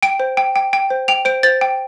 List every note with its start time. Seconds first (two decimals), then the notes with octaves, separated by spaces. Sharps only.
0.03 G5 D7
0.20 C5
0.37 G5
0.56 G5
0.73 G5
0.90 C5
1.08 G5 F7
1.25 C5 D7
1.43 C5 A6
1.61 G5